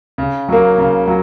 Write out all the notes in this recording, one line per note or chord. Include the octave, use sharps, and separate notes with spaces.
C#3
F#3 A#3
C#3
F#3